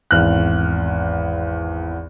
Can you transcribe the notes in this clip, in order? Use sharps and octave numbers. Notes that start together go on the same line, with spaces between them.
G#1 E2 F6 F#6